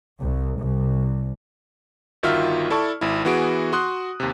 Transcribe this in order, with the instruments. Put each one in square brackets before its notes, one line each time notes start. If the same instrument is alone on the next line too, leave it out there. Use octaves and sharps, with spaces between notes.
[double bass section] C2
C2
[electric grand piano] G1 D#3 F4 F#4 E5 F6
E4 A4 D5 A5 C#6
G#1 E4
E3 B3 F#4 G#4 D7
F#4 C6 D#6 F#6
D#2 C3